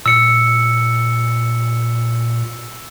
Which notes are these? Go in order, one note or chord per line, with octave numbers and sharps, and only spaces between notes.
A#2 E6 C#7